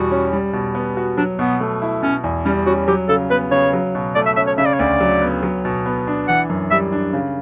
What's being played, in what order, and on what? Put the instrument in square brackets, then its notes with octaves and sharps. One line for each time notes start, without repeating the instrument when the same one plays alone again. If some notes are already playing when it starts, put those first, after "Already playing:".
Already playing: [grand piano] E2 B2 G3 [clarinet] F#4
[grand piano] C#4
G3
B2
B3
F#4
[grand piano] F#3 [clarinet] D4
[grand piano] B2 [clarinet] B3
[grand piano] A3
E4
[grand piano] B2 [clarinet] C#4
[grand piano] E2
[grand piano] G3 [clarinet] C#4
[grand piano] C#4 [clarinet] F#4
[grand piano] F#3 [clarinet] G4
[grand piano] C#3 [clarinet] A4
[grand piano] B3 [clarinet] B4
[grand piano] C#3 [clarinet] C#5
[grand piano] F#3
B2
[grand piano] A3 [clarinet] D5
[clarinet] E5
[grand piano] C#4 [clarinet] E5
[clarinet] C#5
[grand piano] C#3 [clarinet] E5
[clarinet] D5
C#5
[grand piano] D2 [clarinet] D5
[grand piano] F#3
B3
F#3
B2
B3
D4
[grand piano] E3 [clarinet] F#5
[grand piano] F#2
[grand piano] G3 [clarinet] E5
[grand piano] D4
C#3